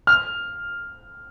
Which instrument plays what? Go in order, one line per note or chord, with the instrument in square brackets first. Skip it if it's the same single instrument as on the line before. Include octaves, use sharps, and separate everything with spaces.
[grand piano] F6